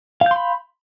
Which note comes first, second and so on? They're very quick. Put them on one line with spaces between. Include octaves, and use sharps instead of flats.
F5 G6 C6 B5